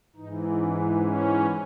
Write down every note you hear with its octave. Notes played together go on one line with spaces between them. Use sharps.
G#2 E3 D#4
C#4
C#4